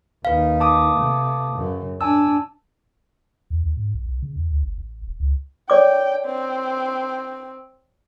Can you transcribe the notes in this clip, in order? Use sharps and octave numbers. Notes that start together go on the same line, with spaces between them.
D#2 D#4 B4 F5
A5 D6 D#6
C3 A3
F#2 C#3
D4 G#5 A5 E6
E2
D#2
G#2
A#1
B1
C#3
E2
D2
G1
A1
D#1
C#2
C#5 D5 G5 D6
C4